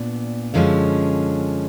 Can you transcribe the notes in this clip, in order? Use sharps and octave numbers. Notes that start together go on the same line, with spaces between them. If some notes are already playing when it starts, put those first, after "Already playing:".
Already playing: A#2 B3 D4
F#2 D3 F3 G#3 C#4